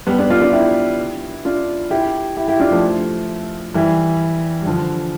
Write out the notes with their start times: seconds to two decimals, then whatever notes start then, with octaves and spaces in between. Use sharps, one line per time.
0.07 G3 B3
0.19 B3 D4
0.30 D4 F4
0.41 D4 F4
0.52 E4 G4
1.45 D4 F4
1.90 E4 G4
2.37 E4 G4
2.48 E4 G4
2.60 D4 F4
2.71 F3 A3
3.74 E3 G3
4.62 G3
4.66 D3 F3